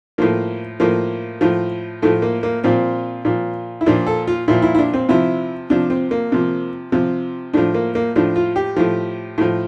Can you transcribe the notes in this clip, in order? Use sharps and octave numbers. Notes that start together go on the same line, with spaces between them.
A2 F3 A#3
A2 F3 A#3
A2 F3
A2 F3 A3
A#3
A#3
A#2 F3 C4
A#2 F3
E4
A#2 F3 D4
A4
F4
A#2 F3 E4
E4
E4
D4
C4
C3 F3 E4
C3 F3 D4
C4
A#3
C3 F3
C3 F3
A2 F3 D4
A#3
A#3
A2 F3 D4
F4
G4
A2 F3
A2 F3